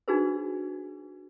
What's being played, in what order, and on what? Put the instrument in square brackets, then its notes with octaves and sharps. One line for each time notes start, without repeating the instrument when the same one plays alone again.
[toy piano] D4 D#4 F#4 G#4 B4 C5